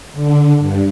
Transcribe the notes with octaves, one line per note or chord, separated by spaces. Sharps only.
D3
G2